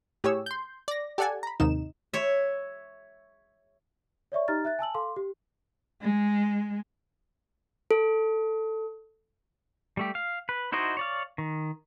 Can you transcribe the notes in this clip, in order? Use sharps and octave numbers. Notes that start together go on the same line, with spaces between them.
A2 G4 G#4 C#5 E6
C6 G6
D5 A#6
G4 A4 D5 F#5 G#5 A5
A#5 B5
D#2 G#2 C3 D#3 D#4 E7
C#5 E5
C#5 D5 E5 C#6
D#4 G4 D#5 A#5 F6 A6
E5 F#6 A6
G#5 A5 E6 F#7
A4 F5 C6 D6
G4
G#3
A4
G3 A3 G4
F5
B4
D#4 E4 F#4 C5 D#5
C#5 D5 F5
D#3